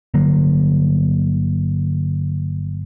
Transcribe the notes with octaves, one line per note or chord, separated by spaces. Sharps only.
G1 D3 F#3 A#3